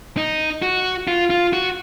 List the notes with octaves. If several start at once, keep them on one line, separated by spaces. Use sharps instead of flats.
D#4
F#4
F4
F4
F#4